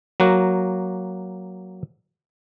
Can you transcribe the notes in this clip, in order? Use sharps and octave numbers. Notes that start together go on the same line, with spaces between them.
F#3 A#3 F#4